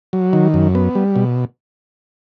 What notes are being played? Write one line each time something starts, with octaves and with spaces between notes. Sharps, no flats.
F#3
D#3
F#2
B3
G3
B2